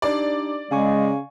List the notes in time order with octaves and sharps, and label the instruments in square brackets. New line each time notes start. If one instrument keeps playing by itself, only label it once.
[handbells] D4 D#4 G4 [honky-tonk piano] D5
[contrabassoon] C#3 [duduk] G#3 [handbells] F5 G#5 C#6